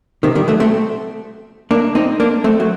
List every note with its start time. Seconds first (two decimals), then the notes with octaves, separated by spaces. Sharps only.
0.23 C3 D#3
0.35 D#3 G3
0.48 F#3 A3
0.60 A3 C4
1.71 A#3 D4
1.95 C4 D#4
2.20 A#3 D4
2.44 A3 C4
2.60 F#3